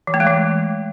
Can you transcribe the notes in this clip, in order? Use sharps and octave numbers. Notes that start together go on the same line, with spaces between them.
E3
A3
G#3
E3